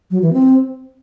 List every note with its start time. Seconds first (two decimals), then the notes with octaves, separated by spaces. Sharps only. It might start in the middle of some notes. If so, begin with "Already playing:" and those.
0.11 F#3
0.22 E3
0.33 C4